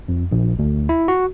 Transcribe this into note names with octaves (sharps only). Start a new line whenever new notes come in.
F2
A#1
D2
E4
F#4